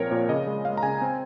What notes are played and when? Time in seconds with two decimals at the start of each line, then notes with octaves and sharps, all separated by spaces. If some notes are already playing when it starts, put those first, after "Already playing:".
Already playing: A#2 F3 C4 A#4 C#5
0.11 A#2 C#5
0.29 C#3 D#5
0.47 G#3
0.65 G#3 F5
0.77 A#5
0.83 C#3 G#5
1.02 C4